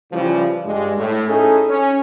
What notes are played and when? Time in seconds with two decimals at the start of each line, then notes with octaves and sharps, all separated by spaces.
0.12 C#3 E3 F3 G3
0.65 G2 G#3
0.98 A2
1.28 C#4 D#4 E4 G#4 A4
1.69 C#4